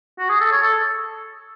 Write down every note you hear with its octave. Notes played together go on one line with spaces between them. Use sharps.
F#4
G#4
A4
C#5
A4